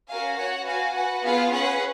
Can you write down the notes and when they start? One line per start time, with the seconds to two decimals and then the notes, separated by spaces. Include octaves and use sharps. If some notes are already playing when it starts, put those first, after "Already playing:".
0.10 C#4 F#4 A#4 F5 G#5
0.37 F#4 C#5 F#5
0.66 F#4 B4 F5 G#5
0.96 F#4 B4 F#5
1.24 B3 F4 G#4 B4 F5
1.52 C#4 G#4 B4 F#5